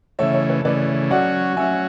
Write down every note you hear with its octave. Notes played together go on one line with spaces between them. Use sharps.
C#3 E3 A3 C#5 E5
C#5
B4
C#3 E3 A3 B4 D5
F#3 C#4 F#4 D5 F#5
F#3 C#4 F#4 E5 G#5